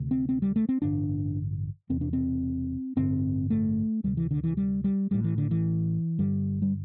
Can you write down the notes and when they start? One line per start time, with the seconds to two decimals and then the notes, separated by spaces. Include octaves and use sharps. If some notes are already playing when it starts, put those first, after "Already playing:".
Already playing: D2 C3
0.11 C4
0.29 C4
0.42 G3
0.56 A3
0.69 C4
0.82 A1 G2 D3 D4
1.89 E1 E2 C3 C4
2.01 D4
2.13 C4
2.96 A1 G2 D3 C4
3.50 A3
4.04 D2 C3 G3
4.17 E3
4.31 D3
4.44 E3
4.57 G3
4.84 G3
5.11 A1 A2 G3
5.24 E3
5.38 D3
5.51 E3
6.18 G1 G2 D3 G3
6.62 G3